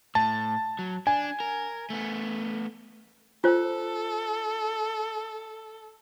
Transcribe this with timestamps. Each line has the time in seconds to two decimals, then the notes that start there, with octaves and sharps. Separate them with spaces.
0.15 A2 A5
0.79 F#3
1.07 D4 G#5
1.40 A#4
1.90 A3 B3
3.44 F4 A4 C5